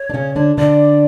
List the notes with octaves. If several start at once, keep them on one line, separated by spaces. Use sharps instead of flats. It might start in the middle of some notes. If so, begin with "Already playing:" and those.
Already playing: C#5
D4
C#3 C#4
D3 D4
D3 D4 D5